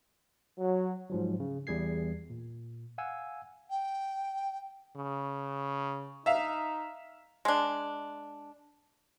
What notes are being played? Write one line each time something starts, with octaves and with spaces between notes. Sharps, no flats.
F#3
G#2 F3 F#3
C#3
E2 G3 G#4 G#6 C7
A#2
F5 F#5 G#5 E6
G5
C#3
D#4 E5 F5
G#3 D4